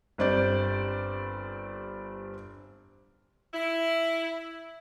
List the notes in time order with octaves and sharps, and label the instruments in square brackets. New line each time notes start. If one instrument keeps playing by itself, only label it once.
[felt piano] G1 G3 C4 C5 D5 G6
[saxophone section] E4